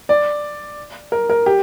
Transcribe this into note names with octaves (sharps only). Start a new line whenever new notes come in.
D5
A#4
A#4
G4